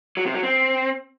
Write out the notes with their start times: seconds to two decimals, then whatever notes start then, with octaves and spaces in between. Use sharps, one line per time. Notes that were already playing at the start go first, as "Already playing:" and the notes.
0.17 F#3
0.26 C3
0.34 F#3
0.43 C4